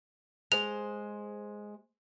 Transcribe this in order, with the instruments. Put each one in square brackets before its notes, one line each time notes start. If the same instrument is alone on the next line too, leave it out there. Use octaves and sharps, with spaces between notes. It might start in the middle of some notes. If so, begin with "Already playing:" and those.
[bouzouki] G#3 C5 [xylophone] F7